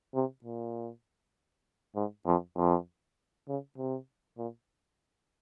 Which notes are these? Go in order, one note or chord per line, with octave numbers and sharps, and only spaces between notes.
C3
A#2
G#2
F2
F2
C#3
C3
A#2